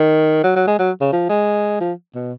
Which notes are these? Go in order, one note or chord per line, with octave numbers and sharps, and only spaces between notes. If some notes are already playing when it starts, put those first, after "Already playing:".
Already playing: D#3
F#3
F#3
G#3
F#3
C#3
F3
G#3
F3
B2